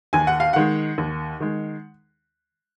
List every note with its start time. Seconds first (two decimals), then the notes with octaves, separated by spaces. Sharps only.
0.13 D#2 G#5
0.27 F#5
0.40 F5
0.53 D#3 G#3 F#5
0.98 D#2
1.40 D#3 G#3